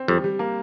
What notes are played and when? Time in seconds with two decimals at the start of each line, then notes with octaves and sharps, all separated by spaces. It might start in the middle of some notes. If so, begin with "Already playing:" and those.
Already playing: C4
0.08 F2 G3
0.24 G3
0.39 A#3